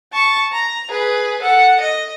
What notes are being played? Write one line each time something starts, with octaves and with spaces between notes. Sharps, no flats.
A5 C#6
A#5
G#4 B4
A4 F#5
D#5